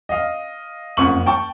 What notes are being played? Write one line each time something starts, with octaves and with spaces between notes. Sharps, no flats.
D#5 F5
F#1 F2 F#5 C#6 F#7
G5 A5 C#6